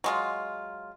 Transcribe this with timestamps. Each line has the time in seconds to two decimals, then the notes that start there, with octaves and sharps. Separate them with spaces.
0.04 F#3 G#3 F4